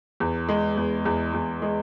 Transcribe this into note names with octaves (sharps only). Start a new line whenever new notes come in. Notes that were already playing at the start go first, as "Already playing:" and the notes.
E2
G#3
E2
E2
E2
G#3